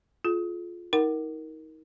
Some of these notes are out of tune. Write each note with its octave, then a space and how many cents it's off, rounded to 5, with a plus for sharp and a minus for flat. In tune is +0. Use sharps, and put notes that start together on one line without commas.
F4 +0 G#4 +45
D#4 +35 A#4 +0 F#5 +30